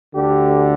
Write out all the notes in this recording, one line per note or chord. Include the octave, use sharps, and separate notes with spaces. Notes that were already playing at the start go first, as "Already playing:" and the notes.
D2 D3 G4